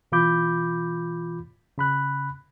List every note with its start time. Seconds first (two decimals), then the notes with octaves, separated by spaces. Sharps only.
0.12 B2 E3 F4 B5 D6 G6
1.78 C#3 B5 F#6